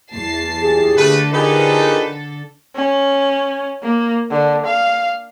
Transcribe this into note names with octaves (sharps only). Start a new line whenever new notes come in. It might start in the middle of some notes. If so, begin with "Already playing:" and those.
E2 A5 C7
A#1 G4 G#4
D3 A3 A4 B4
F3 D#4 G4 G#4 A#4 B4
C#4
A#3
D3
F5